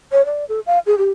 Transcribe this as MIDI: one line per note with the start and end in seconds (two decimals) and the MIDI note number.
0.12 0.25 73
0.25 0.45 74
0.49 0.60 69
0.66 0.79 77
0.86 0.98 68
0.98 1.10 67